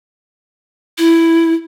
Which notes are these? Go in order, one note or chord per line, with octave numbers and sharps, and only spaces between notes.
E4